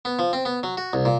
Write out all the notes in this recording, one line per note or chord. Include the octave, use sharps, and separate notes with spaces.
B3
F3
C4
B3
F#3
F#4
C2
A#2